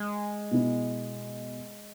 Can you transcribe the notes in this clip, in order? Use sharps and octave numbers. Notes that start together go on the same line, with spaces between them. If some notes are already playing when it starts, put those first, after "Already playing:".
Already playing: G#3
B2 B3 E4